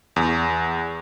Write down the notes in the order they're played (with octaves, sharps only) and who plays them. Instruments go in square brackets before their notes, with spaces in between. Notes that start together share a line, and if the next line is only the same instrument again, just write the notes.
[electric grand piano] E2